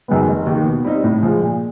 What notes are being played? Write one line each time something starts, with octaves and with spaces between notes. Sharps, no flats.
F#2 D#3 G#3 B3
F1
D#2 D#3
B2
G3 C4 D#4
A2
F3 G#3
A#2